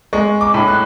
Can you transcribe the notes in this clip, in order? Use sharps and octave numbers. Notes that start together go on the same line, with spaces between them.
G#3 C#6
D6
A2
F#6